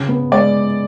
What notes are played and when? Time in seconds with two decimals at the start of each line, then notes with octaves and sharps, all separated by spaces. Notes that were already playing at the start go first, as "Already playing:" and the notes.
Already playing: C#3
0.08 B3
0.31 G#3 D5